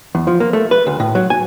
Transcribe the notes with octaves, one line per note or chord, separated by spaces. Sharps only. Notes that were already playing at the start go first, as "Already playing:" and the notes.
E2
F3
A#3
A3
B4
D2
A2
F#3
G#5